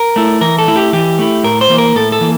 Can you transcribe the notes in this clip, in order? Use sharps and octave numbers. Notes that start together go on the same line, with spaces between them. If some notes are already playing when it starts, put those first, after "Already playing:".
Already playing: A#4
A3 E4
E3 A#4
A4
A3 E4
G4
E3 G4
A3 E4
A2 A#4
C5
E3 A#3
A#4
A2 A4
A4
E3 A#3